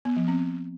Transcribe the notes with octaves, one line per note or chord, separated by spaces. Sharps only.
B3
F3
C4